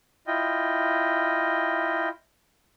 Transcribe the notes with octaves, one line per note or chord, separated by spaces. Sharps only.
E4 F4 D#5 G5